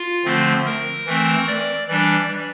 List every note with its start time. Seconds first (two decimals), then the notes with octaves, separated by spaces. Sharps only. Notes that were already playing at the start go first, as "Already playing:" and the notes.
Already playing: F4
0.25 D3 F3 A3 C4
0.66 A#4
1.06 E3 A3 C4
1.48 D5
1.88 E3 G3 D4 D5